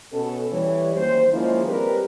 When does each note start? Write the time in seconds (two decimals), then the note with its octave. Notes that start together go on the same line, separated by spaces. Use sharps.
0.13 B2 C#4 A4
0.52 E3 G3 C#5
0.96 F#2 D#3 A#3 C5
1.33 D#3 F3 G#3 A#3 C#4 E4
1.66 G3 G#3 C4 G4 A#4 B4